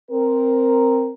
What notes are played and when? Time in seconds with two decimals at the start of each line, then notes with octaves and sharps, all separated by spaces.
0.11 C4 A#4